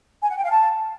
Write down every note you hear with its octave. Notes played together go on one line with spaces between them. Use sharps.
G#5
F#5
G5
F5
A5